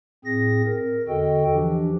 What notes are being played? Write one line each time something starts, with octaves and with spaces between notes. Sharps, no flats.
A2 C4 G#4 A#6
A#4
E2 D3 F#4 A4 D#5 G5
E3 F3 D4 G4